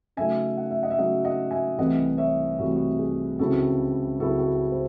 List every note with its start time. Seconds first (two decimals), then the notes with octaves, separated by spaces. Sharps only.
0.17 C#3 F#3 A3 D#4 E5 G#5
0.57 F#5
0.71 E5
0.83 D#5 F#5
0.90 E5
0.98 C#3 F#3 A3 D#4 D#5 F#5
1.25 D#5 F#5
1.51 E5 G#5
1.78 C2 C3 E3 A3 D#5 F#5
2.18 C#5 E5
2.59 C2 C3 E3 A3 F#4
2.76 F#4
2.99 G#4
3.39 C#2 C#3 F#3 C4 E4 F#4 A4
4.19 C#2 C#3 F#3 C4 E4 F#4 A4
4.39 F#4 A4
4.72 C5